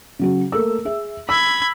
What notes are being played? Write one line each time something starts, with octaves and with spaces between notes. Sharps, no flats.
C#3 F#3 F#4
A3 A#3 E6
G#4 E5
B5 E6 G#6